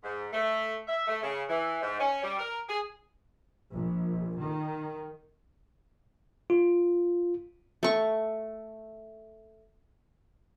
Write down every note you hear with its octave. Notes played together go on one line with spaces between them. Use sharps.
G#2
A3
E5
A3
C#3
E3
G#2
C#4
G3
A#4
G#4
A#1
D#3
F4
A3 C#6